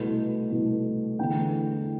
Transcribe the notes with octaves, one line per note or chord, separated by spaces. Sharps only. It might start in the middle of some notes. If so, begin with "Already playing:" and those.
Already playing: C2 B2 A3
C2 B2 A3
E2 D3 A3 G5